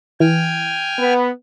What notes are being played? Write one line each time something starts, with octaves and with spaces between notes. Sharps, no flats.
E3 G5 G#5 F6
B3